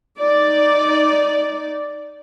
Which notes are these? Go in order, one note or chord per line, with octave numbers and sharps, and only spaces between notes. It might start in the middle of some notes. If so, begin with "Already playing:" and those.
D#4 D5